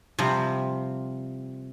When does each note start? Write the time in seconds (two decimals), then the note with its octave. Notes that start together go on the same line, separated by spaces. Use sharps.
0.19 C3 F3 G3